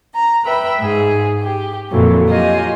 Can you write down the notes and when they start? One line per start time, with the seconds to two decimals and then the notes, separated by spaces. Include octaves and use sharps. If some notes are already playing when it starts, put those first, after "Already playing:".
0.14 A#5
0.44 B4 E5 G5 B5
0.80 G#2 G#4
1.42 G4
1.90 F2 A#2 D3 E3 F#3
2.27 F#3 F4 G4 D#5 G#5